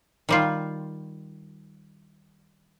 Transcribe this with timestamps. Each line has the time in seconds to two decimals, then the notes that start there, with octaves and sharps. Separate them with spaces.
0.29 D#3 G3 F4